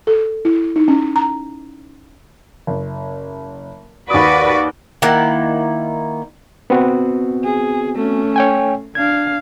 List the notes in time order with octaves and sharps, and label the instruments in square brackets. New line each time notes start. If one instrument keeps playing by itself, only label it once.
[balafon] A4
E4
D#4
C#4
A#5
[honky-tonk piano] F#1
[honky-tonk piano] D#2 D#6 [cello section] F#4 B4 D5
[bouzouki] D#3 A#3 E4 F#5
[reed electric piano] B3 C4 F#4
[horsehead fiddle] G#4
A3 C#4
[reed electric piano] C#5 G5 G#5
[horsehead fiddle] D4 F5 [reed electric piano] G#6